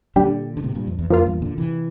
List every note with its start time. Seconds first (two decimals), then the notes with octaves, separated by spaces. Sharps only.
0.16 A#2 D3 G3 D4 G4
0.57 D3
0.63 A2 C3
0.75 G2 A#2
0.87 F2
0.99 E2
1.10 F2 F3 A#3 F4
1.26 E2 G2
1.42 A#2 D3
1.58 C3 E3